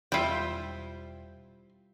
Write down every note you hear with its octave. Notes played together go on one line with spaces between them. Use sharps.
E1 G3 C4 E4 F4 G5